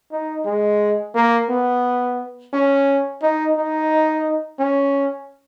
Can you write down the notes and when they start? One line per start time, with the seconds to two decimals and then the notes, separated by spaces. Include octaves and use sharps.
0.11 D#4
0.45 G#3
1.15 A#3
1.50 B3
2.53 C#4
3.22 D#4
3.57 D#4
4.59 C#4